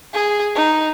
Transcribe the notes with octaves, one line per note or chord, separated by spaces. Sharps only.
G#4
D#4